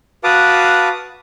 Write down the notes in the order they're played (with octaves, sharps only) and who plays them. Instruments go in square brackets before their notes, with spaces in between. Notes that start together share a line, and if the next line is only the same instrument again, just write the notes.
[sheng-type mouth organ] F#4 B4 F5 A5 D6 D#6